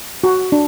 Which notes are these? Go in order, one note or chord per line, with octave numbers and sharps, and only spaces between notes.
F#4
D4